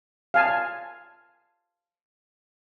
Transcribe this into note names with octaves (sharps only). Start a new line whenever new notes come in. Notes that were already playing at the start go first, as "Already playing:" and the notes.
F5 G#5 A5